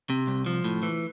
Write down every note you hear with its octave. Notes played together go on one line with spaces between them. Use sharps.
C3
C2
F3
A2
E3